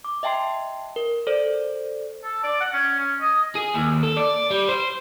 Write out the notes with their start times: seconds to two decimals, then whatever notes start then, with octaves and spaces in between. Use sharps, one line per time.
0.04 D6
0.23 D#5 E5 G5 A5 C6 C7
0.96 A#4
1.27 A4 C5 D5
2.24 A4
2.43 D5
2.60 F#5
2.73 C#4
2.99 C#4
3.21 D#5
3.55 G#4
3.74 D#2
4.03 A4
4.17 D5
4.50 G3
4.69 C5